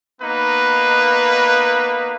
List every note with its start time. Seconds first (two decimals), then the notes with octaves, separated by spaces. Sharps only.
0.22 A#3 B3 D#4 B4